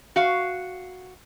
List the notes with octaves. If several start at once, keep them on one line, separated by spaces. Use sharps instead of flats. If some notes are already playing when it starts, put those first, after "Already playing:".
F#4 F5